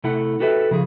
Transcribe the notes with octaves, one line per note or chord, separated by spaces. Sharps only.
C3 A3 E4 F#5
F#4 G4 A4 B4 E5
C#3 F3 G#4